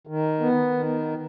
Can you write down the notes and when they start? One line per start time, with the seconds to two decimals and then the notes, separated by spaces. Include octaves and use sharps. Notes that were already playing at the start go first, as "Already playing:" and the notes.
0.07 D#3
0.40 B3
0.73 D#3